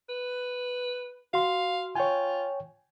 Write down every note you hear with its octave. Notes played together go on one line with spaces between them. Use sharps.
B4
F#4 F5 C6
F4 C#5 G5 G#5